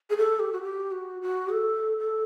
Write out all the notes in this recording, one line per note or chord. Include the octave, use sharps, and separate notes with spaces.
G#4
A4
G4
F#4
G4
F#4
F#4
A4
A4